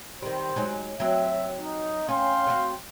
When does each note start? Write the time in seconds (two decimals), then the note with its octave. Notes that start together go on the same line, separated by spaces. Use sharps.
0.22 D#3 G3 C4 C5
0.56 F#3 G#3 D#4
1.00 F#3 C4 E5
1.58 D#4
2.08 C#4 F5 G5 C6
2.47 C4 E4 F#4